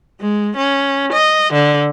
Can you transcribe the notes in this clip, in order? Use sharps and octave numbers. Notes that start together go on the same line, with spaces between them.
G#3
C#4
D#5
D3